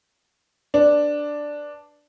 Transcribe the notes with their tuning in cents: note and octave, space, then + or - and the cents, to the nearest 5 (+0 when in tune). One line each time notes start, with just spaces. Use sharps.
D4 +0 B4 +0